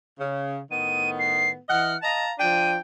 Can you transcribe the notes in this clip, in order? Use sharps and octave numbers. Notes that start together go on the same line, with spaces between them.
C#3
A2 D#3 B3 D#7
C7
E3 D#5 F#5 F6
D#5 F5 A5 A#5
F3 D4 G5 D#7